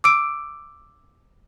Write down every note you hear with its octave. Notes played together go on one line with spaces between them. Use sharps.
D6 E6 D7